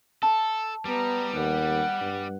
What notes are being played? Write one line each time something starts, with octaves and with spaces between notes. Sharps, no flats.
A4 A5
G3 B3 A#5
D#2 F#5
G2